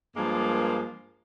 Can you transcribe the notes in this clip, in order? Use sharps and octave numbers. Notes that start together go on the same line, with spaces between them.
G2 F3 G#3 A#3